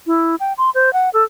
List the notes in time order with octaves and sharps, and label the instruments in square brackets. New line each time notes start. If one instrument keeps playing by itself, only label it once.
[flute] E4
G5
C6
C5
F#5
A4